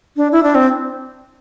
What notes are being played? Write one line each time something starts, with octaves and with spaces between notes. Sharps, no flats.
D4
E4
D4
C4